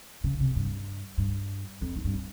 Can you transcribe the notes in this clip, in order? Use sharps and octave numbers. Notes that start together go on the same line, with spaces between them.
C#3
C3
G2
G2
F2
G#2
G2